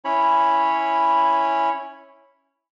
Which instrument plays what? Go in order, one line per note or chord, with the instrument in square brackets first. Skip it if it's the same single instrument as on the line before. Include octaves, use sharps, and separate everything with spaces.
[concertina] C#4 E4 C#5 B5